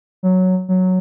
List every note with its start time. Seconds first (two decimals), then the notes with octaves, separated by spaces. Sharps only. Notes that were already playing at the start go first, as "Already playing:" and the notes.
0.23 F#3
0.69 F#3